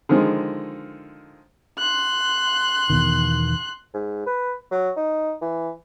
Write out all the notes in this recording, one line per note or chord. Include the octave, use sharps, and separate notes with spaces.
D3 D#3 F3 G#3
C6 F#6
E2 B2 D#3
G#2
B4
F#3
D#4
E3